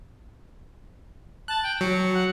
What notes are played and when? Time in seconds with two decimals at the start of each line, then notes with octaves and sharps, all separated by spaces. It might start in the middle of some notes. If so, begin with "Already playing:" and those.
1.48 A5 F#6
1.63 G5
1.81 F#3 C#7
2.14 F#5